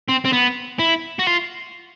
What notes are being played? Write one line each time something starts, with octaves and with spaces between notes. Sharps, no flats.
C4
C4
B3
E4
F#4
F4